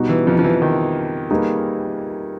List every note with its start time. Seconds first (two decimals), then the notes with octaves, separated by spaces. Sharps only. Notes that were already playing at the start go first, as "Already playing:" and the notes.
Already playing: B2 G3 B3 D#4 F#4
0.09 E3
0.27 F2 F3
0.39 F3
0.44 E3
0.62 D#3
1.31 G3 A#3 D#4 G#4 B4